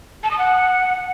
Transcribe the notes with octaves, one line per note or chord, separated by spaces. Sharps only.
A5
D#6
F#5